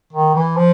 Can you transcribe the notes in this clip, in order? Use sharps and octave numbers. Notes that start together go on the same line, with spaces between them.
D#3
E3
F3